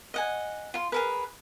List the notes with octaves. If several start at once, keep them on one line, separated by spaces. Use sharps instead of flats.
D#5 F#5 G#5
F4 C6
G#4 A#4 B4